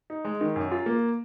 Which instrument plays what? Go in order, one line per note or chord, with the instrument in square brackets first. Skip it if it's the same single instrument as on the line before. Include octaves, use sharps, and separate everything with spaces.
[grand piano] D#4
G#3
D#3
F#2
F4
A#3